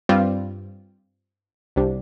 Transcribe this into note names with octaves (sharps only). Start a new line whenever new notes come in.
G2 G3 C4 F4
C2 C3 G3 D4